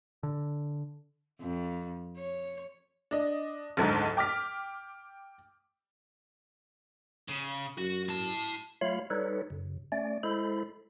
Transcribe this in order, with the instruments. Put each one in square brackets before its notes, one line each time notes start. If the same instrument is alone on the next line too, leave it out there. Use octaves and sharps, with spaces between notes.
[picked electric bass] D3
[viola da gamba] F2
C#5
[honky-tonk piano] D4 D#5
F#1 D2 G#2 D#4
G5 D6 F6 B6
[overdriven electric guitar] C#3
[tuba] F#2 [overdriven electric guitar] F#4
[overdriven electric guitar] E4 A5
[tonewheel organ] F#3 A3 F4 C#5 F5 B5
G3 D#4 A4 B4 C#5
F#2 C#3
A3 C#4 D5
G#3 E4 A4 C5 B5